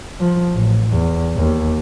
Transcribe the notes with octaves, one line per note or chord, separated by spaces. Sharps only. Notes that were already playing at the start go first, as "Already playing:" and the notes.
F3
A1
E2
D#2